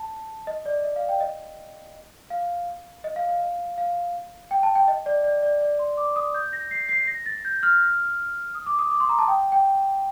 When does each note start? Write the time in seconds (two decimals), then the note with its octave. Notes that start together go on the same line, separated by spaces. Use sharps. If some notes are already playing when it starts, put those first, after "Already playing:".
Already playing: A5
0.47 D#5
0.66 D5
0.84 D#5
0.96 F5
1.09 G5
1.21 D#5
2.30 F5
3.04 D#5
3.16 F5
3.29 F5
3.40 F5
3.78 F5
4.51 G5
4.63 A5
4.75 G5
4.88 D#5
5.06 D5
5.24 D5
5.43 D5
5.61 D5
5.79 C6
5.97 D6
6.16 D#6
6.34 G6
6.53 A#6
6.71 C7
6.89 C7
7.07 A#6
7.26 A6
7.45 G6
7.63 F6
8.55 D#6
8.66 D6
8.79 D#6
8.91 D6
9.00 C6
9.09 A#5
9.19 A5
9.28 G5
9.52 G5